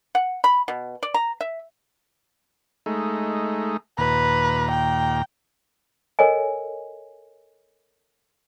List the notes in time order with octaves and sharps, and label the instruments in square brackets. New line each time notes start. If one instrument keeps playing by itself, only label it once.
[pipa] F#5
B5
B2
D5
A#5
E5
[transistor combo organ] G#3 A3 D#4
[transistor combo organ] D#2 A#2 A#5 [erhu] B4
[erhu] G5
[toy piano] A4 A#4 C#5 D#5 G#5